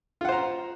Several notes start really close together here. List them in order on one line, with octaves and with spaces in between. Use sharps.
F4 F#5 C5 A#5